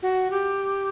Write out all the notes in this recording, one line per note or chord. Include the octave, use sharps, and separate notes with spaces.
F#4
G4